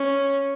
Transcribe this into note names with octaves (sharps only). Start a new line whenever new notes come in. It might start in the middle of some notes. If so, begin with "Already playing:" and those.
Already playing: C#4